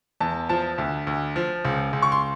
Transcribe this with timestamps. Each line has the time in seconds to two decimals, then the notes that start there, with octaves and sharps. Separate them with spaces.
0.20 E2 A5
0.49 F3 A5
0.78 D2
1.07 D2
1.36 F3
1.65 C#2
1.93 C#2
2.02 C#6
2.12 C6